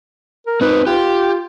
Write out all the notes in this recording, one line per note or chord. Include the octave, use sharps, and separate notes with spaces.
A#4
C4 D#4 B4
F4 G4